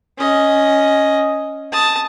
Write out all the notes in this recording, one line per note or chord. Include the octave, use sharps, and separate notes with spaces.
C#4 D#5
A5 D#6